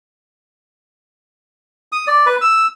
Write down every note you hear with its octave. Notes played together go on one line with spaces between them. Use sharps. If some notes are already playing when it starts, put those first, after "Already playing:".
D#6
D5
B4
E6